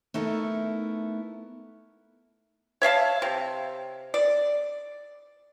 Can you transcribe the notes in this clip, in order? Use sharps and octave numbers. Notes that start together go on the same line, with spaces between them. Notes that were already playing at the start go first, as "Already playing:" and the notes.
A3 B3 D#4 E4 A4 A#4
C#5 E5 F5 A5
C3
D5